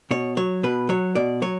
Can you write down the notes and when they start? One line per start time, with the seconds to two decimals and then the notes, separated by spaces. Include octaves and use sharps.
0.11 B2 C#5
0.37 F#3 C#5
0.63 B2 B4
0.89 F#3 C#5
1.15 B2 D5
1.42 F#3 C#5